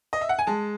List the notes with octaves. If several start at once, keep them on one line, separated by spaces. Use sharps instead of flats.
D#5
E5
F#5
G#5
G#3 A5